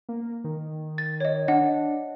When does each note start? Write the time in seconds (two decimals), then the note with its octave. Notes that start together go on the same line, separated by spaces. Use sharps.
0.09 A#3
0.44 D#3
0.98 A6
1.20 C#5 D#5
1.48 D4 D#5 F#5